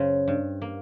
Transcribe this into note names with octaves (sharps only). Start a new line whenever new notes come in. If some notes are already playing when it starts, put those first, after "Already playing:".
Already playing: F#2 C#3 C5
G2
A#3